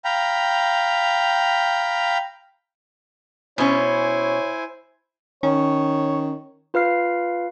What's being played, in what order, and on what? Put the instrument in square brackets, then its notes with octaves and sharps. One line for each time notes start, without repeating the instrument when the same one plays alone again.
[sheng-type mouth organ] F5 G5 A#5 B5
[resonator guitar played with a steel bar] B2 C#4 [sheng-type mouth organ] E4 C5 G#5 [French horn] C#5
[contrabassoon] D#3 [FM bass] C#4 [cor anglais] C#5
[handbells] F4 B4 F5 F6 C7